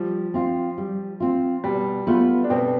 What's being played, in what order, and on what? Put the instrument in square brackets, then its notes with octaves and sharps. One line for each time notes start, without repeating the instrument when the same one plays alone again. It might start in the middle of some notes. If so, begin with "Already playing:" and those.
Already playing: [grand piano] F3 [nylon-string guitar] G3
[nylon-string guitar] C4 F4
G3
C4 F4
[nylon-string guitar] B2 [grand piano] G3
[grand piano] A3 [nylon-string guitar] B3 F4 B4
[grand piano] D4
[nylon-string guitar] B2 [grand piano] C4